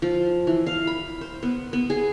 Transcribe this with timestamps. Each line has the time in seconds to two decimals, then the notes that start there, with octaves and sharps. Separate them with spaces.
0.02 F3
0.47 E3
0.66 F5
0.87 B5
1.21 C5
1.43 B3
1.73 B3
1.90 G#4